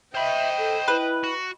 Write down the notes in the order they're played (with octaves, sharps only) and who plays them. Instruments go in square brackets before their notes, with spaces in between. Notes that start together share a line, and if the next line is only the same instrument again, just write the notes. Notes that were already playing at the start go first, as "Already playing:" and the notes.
[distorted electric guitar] C5 B5 [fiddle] D#5 G5 [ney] E5
[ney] A4
[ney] E4 [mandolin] B4
[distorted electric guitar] F#4